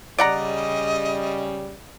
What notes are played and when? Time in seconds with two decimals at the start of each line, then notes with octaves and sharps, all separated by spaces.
0.18 C#3 G3 D5 D#5 F#5 A#5